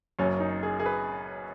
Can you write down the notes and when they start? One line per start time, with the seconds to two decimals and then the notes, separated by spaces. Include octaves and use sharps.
0.19 F#1 F#2 F#3 C#4
0.40 D#4
0.63 G#4
0.80 G#4
0.86 B4